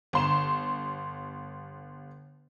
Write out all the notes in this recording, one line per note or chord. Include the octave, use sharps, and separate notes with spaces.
G1 C6 E7